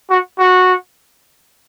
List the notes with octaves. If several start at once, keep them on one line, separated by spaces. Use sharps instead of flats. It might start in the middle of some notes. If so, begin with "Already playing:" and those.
F#4
F#4